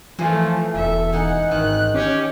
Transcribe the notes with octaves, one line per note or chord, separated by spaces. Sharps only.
E3 F3 A3
E1 A4 E5
E3 D#4 F#5
G#1 D#3 F#6
C#4 G4 C#5